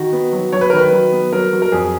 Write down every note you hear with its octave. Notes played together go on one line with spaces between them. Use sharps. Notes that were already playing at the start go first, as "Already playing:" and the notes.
Already playing: D#3 F#4
B3
F#3
F#3 C#5
B4
D#3 A#4
B4
F#3
B3
F#3 A#4
F#3
A#4
F2 G#4